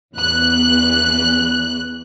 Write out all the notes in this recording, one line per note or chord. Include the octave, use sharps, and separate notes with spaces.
E2 F#6